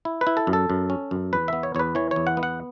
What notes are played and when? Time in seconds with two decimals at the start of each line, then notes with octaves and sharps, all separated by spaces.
0.05 E4
0.21 B4
0.27 E4
0.37 A4
0.47 F#2
0.53 A4
0.70 F#2
0.90 C#4
1.11 F#2
1.33 E2 B4
1.48 B3 E5
1.63 C#5
1.75 E2 C#5
1.79 B4
1.95 E3 C#5
2.11 C#5
2.16 E2
2.27 F#5
2.37 B3
2.43 F#5